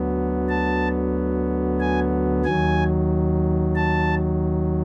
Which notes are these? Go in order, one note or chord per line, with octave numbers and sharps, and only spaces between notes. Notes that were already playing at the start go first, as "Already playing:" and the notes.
Already playing: D2 D3 F#3 B3
A5
G#5
D#2 D#3 F#3 G#5
A5